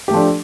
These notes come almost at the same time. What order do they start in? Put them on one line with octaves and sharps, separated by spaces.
G4 A3 F3 D4